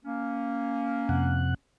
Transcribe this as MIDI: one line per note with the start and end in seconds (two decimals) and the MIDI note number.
0.04 1.53 58
0.04 1.53 61
1.09 1.54 41
1.09 1.54 48
1.09 1.54 78